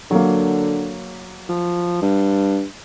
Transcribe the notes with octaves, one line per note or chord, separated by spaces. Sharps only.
D3 F#3 A#3
F3
G2